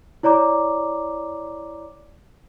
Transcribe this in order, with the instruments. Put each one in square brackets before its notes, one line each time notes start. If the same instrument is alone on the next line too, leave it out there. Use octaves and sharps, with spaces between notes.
[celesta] E4 C#5 D5 A#5 D6